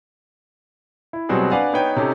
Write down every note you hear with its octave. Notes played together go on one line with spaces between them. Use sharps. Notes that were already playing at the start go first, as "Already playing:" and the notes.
E4
B2 F#3 G3 C4 F#4 G#4
D4 B4 D5 F5 F#5 G#5
B3 D#4 B4 C#5 G5
C3 C#4 D#4 G4 A4